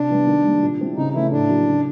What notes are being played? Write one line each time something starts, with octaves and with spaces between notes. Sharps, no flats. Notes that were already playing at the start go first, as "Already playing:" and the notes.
Already playing: C3 D4
E3 G3 B3 E4
D#3
G3 A#3
A#2
G3 C4 E4
C#3 D#4
E3 A3 C#4 E4
A2 D4
F#3 A#3
C#3